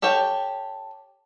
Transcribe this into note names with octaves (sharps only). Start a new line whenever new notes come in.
G4 A4 C#5 G5